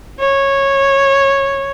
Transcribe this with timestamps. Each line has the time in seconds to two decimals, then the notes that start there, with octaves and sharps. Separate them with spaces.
0.20 C#5